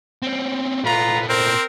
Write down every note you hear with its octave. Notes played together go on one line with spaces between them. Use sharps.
C4 C#4
A#2 A3 F4 B4 A#5
C4 A#4 C5